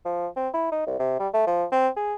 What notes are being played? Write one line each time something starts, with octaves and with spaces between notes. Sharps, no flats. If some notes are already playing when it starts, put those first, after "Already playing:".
F3
C4
E4
D#4
C2
C3
G3
A3
F3
C4
G#4